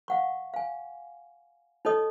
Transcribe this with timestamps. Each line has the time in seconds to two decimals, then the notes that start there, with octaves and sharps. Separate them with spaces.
0.08 F5 F#5 C#6
0.54 F5 G#5
1.85 D#4 A4 C#5 D#5 D#6